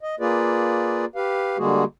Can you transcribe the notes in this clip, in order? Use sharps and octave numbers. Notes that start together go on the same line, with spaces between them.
D#5
A#3 F4 G#4 B4 D5
G4 B4 F5
D3 G3 G#3 A#3 F#4 G#4